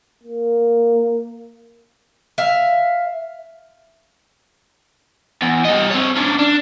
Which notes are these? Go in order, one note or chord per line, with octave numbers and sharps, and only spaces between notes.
A#3
E5 F5
E2
G3 D#5
C4 C#5
C#4 D4
D4